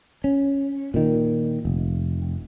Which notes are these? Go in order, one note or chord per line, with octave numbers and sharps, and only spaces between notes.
C#4
A#2 D#3
F1